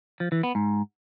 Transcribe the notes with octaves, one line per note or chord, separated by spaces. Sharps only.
F3
E3
B3
G#2